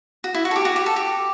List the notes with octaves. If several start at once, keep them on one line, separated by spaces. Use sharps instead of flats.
F#4
E4
F#4
A4
G4
F#4
G4
A4
G4